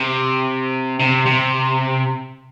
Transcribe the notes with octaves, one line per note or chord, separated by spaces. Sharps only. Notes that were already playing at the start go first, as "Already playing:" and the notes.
Already playing: C3
C3
C3